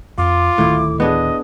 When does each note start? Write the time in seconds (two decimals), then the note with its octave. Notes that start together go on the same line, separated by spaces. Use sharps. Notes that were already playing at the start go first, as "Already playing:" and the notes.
0.18 F2 F4 D6
0.58 D1 A2 D#3 E4
1.00 B3 D4 G#4 D#5